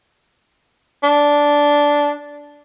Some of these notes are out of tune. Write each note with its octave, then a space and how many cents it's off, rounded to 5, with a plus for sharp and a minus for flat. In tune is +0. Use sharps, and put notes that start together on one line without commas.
D4 -10